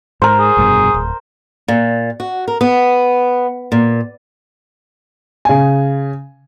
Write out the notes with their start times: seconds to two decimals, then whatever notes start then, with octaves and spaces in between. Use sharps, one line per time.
0.22 G#2 A#4 C5
0.39 G#4
0.57 F1 G2 B2
0.94 D1
1.68 A#2
2.20 F#4
2.48 A#4
2.61 B3
3.72 A#2
5.45 C#3 G#5